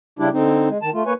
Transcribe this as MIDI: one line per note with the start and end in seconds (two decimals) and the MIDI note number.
0.19 0.29 49
0.19 0.29 55
0.19 0.29 62
0.19 0.29 64
0.19 0.29 67
0.33 0.69 50
0.33 0.69 60
0.33 0.69 63
0.69 0.78 56
0.82 0.90 51
0.82 0.90 81
0.94 1.03 57
0.94 1.03 65
1.06 1.13 58
1.06 1.13 71
1.06 1.13 73
1.06 1.13 80